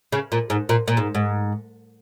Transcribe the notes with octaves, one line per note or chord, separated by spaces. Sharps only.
C#3
A#2
G#2
A#2
A#2
G#2
G#2